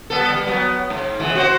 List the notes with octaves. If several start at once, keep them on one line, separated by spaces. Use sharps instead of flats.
G3 B3 A4
G3
F#3 B3
G#2
B2 E3 G#3
F#4 C5